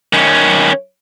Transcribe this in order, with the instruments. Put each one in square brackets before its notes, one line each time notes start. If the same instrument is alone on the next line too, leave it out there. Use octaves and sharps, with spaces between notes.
[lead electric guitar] D#3 C#4